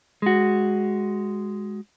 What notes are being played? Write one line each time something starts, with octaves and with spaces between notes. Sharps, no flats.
G#3 F#4